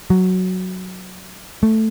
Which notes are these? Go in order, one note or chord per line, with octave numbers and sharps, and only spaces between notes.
F#3
A3